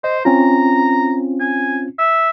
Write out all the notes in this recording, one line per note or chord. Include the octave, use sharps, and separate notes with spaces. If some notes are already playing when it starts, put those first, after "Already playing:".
C5 D#5
C4 C#4 F4 A#5
G#5
E5